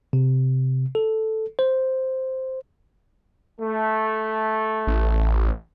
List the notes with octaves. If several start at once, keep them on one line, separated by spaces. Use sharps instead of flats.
C3
A4
C5
A3
A1